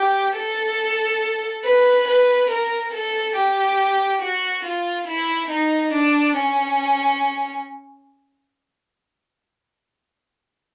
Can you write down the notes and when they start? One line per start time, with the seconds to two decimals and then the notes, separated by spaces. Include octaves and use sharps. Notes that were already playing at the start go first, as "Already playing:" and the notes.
Already playing: G4
0.36 A4
1.65 B4
2.08 B4
2.50 A#4
2.93 A4
3.36 G4
4.22 F#4
4.65 F4
5.08 E4
5.50 D#4
5.93 D4
6.36 C#4